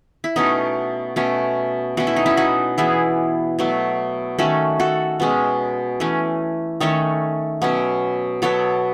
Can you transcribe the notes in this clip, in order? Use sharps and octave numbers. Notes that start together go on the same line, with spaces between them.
E4
B2 A3 C#4 D#4
B2 A3 C#4
B2 A3 C#4 F#4
E4
D#4
C#4 E4
D#4 F#4
E3 B3 E4 G#4
B2 F#3 A3
D#3 A3 C#4 F#4 A4
F#4 A4
B2 G#3 C#4
E3 A3 C#4
D#3 A3 C#4 A4 C#5
B2 F#3 C#4
B2 F#3 B3 A4 C#5